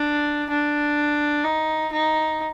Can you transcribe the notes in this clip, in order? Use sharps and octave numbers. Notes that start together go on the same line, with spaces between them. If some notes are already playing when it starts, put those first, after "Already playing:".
Already playing: D4
D4
D#4
D#4